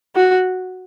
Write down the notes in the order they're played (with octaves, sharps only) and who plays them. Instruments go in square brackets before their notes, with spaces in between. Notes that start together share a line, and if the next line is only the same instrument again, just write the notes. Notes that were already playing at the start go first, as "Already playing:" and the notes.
[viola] F#4